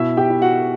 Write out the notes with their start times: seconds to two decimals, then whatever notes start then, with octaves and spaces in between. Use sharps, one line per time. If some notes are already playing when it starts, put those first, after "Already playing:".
Already playing: B2 E4 E5
0.17 G4 G5
0.30 E4
0.42 F#4 F#5